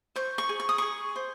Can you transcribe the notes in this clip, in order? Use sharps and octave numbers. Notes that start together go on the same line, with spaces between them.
C5 C#6
C#6
G#4
C#6
D#6
G#4 C#6
C5